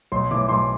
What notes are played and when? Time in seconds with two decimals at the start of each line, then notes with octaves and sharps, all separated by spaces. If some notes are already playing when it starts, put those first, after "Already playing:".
0.12 B1 C6
0.31 A2 E3 D6
0.49 B1 C6